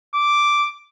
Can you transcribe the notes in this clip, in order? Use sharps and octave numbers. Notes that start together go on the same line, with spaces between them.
D6